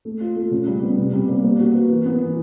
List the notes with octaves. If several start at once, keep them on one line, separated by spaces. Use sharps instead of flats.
A3
F4
A3
C#3
G3
B3
C3
G3
A#3
A#3
F#4
B4
E3
B3
E3